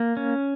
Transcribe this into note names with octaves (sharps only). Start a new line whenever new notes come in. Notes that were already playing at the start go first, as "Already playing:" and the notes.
Already playing: A#3
C#4